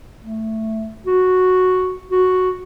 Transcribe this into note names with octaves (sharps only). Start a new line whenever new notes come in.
A3
F#4
F#4